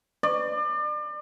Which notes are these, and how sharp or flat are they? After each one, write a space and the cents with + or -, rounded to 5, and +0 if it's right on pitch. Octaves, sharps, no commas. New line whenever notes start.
D5 +35